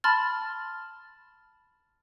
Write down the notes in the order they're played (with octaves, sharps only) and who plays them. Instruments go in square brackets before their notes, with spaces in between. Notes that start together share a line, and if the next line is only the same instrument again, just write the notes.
[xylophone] A5 B5 C6 F6 A6